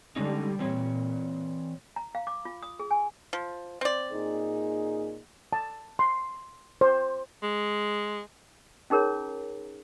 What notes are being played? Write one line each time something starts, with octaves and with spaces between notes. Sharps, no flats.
D3 G3 G#3 C#4 D#4
A#2 E3 C4 C#5
A#5
F5
D6
F4
D#6
G#4
G#5
F3
C4 D5
A#2 D#4 G#4
A5
C6
C5
G#3
C#4 D#4 G#4 A#4 C#5 A#5